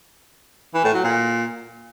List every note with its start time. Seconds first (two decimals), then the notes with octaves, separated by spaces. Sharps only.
0.74 E3
0.84 A2
0.94 F#3
1.04 A#2